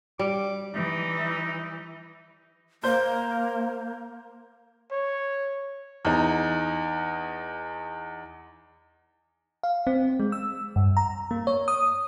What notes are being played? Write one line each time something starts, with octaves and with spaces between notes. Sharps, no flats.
G3 D6
E3 D#4
A#3 C5 G6
C#5
E2 D#4
F5
C4
G#3
E6
G2
A#5
A#3
C#5
D#6